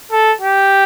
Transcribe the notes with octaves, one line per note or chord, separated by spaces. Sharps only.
A4
G4